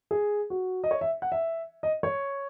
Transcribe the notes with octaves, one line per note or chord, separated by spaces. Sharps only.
G#4
F#4
D#5
C#5
E5
F#5
E5
D#5
C#5